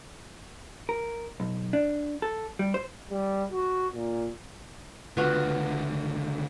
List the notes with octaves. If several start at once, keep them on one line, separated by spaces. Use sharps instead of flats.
A#4
B1
D4
A4
G3
C5
G3
F#4
A#2
C#2 D3 B3 F4 F#4